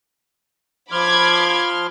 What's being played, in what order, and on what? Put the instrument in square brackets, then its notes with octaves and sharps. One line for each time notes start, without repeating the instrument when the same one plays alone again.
[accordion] F3 C6 F6 [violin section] B5 D6 G#6